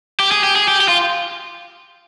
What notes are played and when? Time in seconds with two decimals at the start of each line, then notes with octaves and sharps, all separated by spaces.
0.20 G4
0.31 G#4
0.44 G4
0.56 G#4
0.68 G4
0.81 G4
0.89 F4